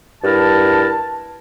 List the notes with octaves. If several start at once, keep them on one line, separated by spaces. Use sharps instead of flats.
G2 E4 A#4 A5